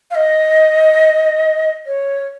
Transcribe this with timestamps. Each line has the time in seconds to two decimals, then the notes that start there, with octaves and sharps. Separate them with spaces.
0.11 F5
0.15 D#5
1.86 C#5